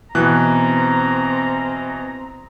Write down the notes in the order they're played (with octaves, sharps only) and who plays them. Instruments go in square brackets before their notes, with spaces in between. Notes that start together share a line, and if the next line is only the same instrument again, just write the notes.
[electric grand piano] B2 E3 F#6 [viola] C4 A#5